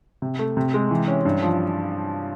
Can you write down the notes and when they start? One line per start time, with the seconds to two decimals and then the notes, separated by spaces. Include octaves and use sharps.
0.22 C3
0.39 A3
0.57 C3
0.74 G#3
0.91 E3
1.08 C#4
1.25 G2
1.42 F3